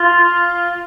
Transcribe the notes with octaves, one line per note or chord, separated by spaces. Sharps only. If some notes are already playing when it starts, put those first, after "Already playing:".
Already playing: F4